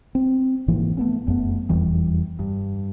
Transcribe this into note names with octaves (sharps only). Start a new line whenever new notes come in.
C4
G#2 E3 F3 A#3
A3 B3 C#4
F1 F#2 A3 B3
F1 E2 E3 G3
G2